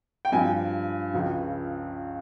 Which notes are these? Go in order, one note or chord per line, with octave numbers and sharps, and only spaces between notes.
G5
G2 F3 G#5
C#2 C#3 F3